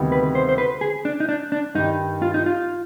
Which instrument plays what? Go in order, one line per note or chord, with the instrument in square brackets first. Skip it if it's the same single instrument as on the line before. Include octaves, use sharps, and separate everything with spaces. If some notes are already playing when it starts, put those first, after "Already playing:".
Already playing: [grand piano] D2 C3 D#3 G3 B3
[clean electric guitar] B4
C5
C5
B4
G#4
D4
D#4
D4
D4
[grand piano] G2 D#3 G3 [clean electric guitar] D#4
[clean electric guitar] F4
D#4
F4